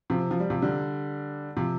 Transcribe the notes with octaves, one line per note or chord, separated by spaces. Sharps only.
C3 F3
F3
G3
C3 F3
D3 G3
C3 F3